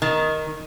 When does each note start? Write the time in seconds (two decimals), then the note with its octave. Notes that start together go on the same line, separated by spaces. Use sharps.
0.02 D#3